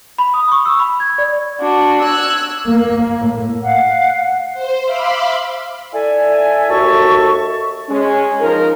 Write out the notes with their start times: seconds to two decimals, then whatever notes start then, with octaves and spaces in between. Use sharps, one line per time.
0.18 B5
0.34 D#6
0.52 C#6
0.65 E6
0.79 B5
1.00 G#6
1.18 D5
1.60 D4 F#4
2.03 E6 F#6 G#6
2.66 A#3
3.20 A2
3.62 F5 F#5
4.54 C5
4.85 E5 F5 B5 C6 D6
5.93 E4 A4 D5 E5 G#5
6.69 D#2 F#4 A4 E5 A5 C#6
7.89 G#3 C#4
8.40 F3 D#4 A#4